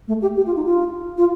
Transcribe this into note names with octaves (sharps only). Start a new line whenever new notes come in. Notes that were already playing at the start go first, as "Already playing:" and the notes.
A3
G4
G4
F4
D#4
F4
F4